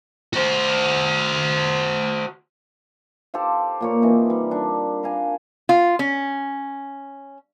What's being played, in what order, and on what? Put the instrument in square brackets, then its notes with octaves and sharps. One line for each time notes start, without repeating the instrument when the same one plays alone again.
[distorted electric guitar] F#4 C5
[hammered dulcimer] G4 A4 C5 F5
A#2 A#3 C#5
E3 C4 D#4
G3
G3 D4
A#4 F5 G#5
[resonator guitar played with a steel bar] F4
C#4